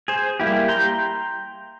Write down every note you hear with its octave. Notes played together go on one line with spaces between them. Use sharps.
G#4 C5
G3 A#3 E4 G4
G5 A#5 C6